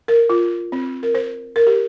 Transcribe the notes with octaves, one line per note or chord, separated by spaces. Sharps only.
A#4
F4
C4
A#4
C5
A#4
G4